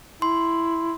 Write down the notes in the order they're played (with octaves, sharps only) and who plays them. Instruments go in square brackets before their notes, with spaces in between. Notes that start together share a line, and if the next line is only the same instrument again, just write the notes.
[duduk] E4 [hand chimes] C6